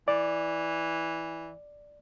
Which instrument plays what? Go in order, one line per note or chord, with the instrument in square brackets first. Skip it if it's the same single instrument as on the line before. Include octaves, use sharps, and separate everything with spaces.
[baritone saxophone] E3 [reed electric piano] D5